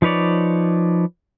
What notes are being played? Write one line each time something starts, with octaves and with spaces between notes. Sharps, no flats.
F3 D#4 B4 C#5 D5